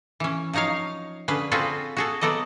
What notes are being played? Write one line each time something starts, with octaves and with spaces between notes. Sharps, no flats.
E3 C#4
F3 F#3 D#4 C#5 F5
D3 C#4 G#4 B4
C4 F4 F#4 G#4 A4 B4
F#4 G#4 A4
F#3 B3 A4 D5 D#5